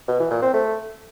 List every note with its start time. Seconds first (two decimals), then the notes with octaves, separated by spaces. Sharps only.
0.08 B2
0.19 E3
0.31 A#2
0.42 C4
0.53 A3